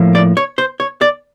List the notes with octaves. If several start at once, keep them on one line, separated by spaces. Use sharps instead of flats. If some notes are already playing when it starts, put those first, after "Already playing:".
Already playing: A2 F3 A#3
D5
C#5
C5
C#5
D5